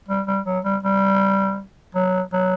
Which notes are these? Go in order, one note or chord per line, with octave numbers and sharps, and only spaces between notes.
G3
G3
F#3
G3
G3
F#3
F#3